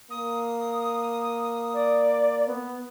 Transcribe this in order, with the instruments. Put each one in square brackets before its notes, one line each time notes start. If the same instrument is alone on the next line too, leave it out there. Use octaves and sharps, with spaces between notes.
[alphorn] A#3 [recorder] D#6
[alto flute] D5
B3